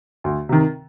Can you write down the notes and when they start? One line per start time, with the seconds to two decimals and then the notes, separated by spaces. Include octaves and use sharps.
0.24 D2
0.49 C3 D#3